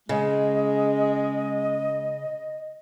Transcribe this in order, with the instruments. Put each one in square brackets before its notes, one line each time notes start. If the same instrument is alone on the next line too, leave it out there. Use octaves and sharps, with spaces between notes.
[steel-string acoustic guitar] C#3 [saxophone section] G#3 [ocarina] D#5